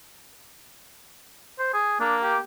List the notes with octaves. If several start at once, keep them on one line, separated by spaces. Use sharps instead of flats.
C5
G#4
A#3 D4
G4